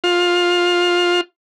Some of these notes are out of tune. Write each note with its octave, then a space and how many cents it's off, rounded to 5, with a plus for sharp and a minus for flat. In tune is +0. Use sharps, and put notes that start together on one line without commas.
F4 +15